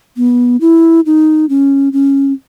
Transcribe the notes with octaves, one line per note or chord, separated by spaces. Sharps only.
B3
E4
D#4
C#4
C#4